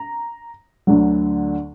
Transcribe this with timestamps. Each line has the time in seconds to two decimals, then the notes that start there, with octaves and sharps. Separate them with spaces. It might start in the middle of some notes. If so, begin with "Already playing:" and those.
Already playing: A#5
0.87 D2 D3 F#3